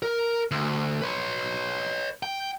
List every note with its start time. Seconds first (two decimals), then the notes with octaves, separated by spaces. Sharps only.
0.02 A#4
0.51 D2
1.02 B4 C#5
2.23 G5